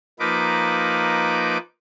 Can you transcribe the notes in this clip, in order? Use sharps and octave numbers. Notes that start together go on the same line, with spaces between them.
F3 A#3 D#4 B4 D6